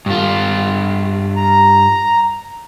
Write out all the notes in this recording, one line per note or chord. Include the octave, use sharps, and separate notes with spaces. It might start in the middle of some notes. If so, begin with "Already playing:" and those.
G2 F4
A#5